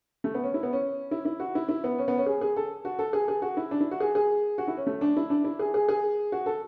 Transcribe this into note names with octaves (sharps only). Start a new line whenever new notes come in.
A3
B3
C#4
E4
B3
C#4
E4
E4
F#4
E4
E4
B3
C#4
B3
C#4
G#4
G#4
A4
F#4
A4
G#4
G#4
F#4
E4
D4
E4
F#4
G#4
G#4
F#4
E4
C#4
A3
D4
E4
D4
E4
G#4
G#4
G#4
F#4
A4